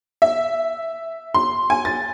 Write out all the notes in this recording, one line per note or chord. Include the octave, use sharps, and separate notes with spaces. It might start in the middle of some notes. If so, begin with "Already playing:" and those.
E5
C6
G#5
A6